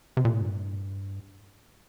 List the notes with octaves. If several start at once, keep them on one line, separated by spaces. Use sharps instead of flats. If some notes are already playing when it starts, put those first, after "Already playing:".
C3
A#2
A2
G2